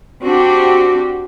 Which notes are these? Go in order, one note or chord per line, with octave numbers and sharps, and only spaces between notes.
C4 D4 F#4 G4